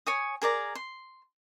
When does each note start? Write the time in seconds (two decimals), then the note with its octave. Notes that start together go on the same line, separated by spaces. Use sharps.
0.07 C#5 G#5 D#6
0.42 G#4 A#4 D5 A#5
0.75 C6